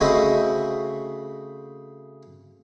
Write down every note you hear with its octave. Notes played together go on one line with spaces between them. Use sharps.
C#3 A3 C4 F#4 D#5 B5